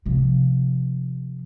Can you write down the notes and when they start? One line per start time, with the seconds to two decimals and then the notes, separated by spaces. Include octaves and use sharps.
0.06 C3 F3